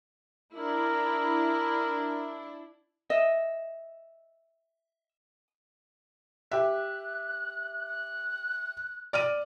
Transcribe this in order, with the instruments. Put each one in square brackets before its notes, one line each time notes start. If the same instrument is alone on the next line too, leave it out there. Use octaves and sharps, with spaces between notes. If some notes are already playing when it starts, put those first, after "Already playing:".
[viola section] D4 E4 [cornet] A#4
[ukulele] D#5 [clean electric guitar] E5
[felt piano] G4 E5 [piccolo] F#6
[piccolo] F#6
[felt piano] D5 F6 D#7